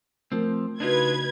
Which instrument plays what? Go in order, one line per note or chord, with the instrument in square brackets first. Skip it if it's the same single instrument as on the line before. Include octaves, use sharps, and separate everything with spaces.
[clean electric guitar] F3 C4 [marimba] A3 A#4
[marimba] C#3 F#4 [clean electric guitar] D4 D#4 F4 [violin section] B4 G#6